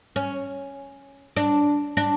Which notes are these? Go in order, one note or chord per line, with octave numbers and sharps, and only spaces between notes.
C#4
D4
D4